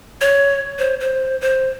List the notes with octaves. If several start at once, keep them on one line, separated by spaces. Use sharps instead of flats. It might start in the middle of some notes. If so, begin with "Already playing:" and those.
C#5
C5
C5
C5